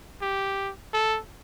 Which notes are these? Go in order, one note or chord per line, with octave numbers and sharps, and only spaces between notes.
G4
A4